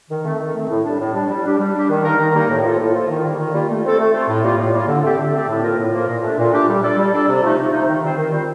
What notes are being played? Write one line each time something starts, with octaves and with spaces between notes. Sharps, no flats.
D#3
A3 C4
D#3
A3 C4
A2
G3 D4
A2
G3 D4
G3
D4 G4
G3
D4 G4
D#3
G3 A#3 D#4 A#4
D#3
G3 A#3 D#4 A#4
A2
F3 A#3 F4 A4
A2
F3 A#3 F4 A4
D#3
G3 A#3 F4
D#3
G3 A#3 F4
A3
C4 F4 A4
A3
C4 F4 A4
A2
G3 A#3 F4
A2
G3 A#3 F4
D3
A3 C4 G4 D5
D3
A3 C4 G4 D5
A2
F3 A#3 F4 A#4
A2
F3 A#3 F4 A#4
A#2
A3 D4 G4
A#2
A3 D4 G4
G3
D4 A4 D5
G3
D4 A4 D5
C3
F3 A3 D#4
C3
F3 A3 D#4
D#3
G3 C4 F4 C5
D#3
G3 C4 F4 C5